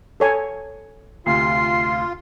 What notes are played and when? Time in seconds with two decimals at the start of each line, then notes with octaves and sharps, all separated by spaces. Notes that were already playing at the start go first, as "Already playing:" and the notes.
0.20 A4 C#5 G#5
1.26 D2 C3 F4 C7